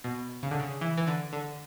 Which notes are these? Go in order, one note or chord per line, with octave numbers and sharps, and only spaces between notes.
B2
C#3
D3
C#3
E3
E3
D3
D3